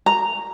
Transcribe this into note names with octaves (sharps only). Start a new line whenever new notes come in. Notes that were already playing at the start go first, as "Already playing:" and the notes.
A#5